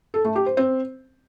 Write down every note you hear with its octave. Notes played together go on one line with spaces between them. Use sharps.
A4
A3
G4
C5
C4